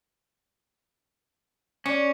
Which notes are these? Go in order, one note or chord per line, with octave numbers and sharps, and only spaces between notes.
C#4 D4